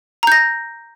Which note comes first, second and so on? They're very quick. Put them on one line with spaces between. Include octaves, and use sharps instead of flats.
A#5 G6 A#6